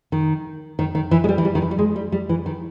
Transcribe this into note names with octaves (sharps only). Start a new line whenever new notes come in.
D#3
D#3
D#3
E3
G#3
G3
E3
G3
D#3
E3
G3
G#3
G3
G3
E3
D#3